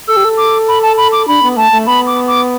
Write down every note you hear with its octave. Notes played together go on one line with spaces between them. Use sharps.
A4 E6
G4
A4
D6
B5
A5
B5
D6
D4 B5
B3
A3 A5
A3
B3 B5
D6
D6